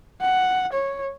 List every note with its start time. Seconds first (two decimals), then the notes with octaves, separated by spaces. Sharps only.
0.21 F#5
0.73 C#5